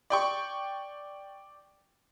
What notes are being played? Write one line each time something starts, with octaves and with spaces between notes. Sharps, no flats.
D5 G5 C#6